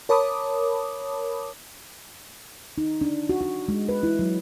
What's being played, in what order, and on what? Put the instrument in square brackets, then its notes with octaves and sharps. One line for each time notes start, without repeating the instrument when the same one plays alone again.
[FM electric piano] A#4 C#5 A5 B5 D6 D#6
[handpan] D#4
D4
F#4
F#4
G#3
B4
E4
F#3